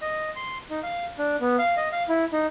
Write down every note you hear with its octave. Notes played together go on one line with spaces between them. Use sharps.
D#5
C6
D#4
F5
D4
B3
F5
D#5
F5
E4
D#4